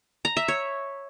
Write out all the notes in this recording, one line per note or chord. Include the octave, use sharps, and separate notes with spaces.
A#5
E5
C#5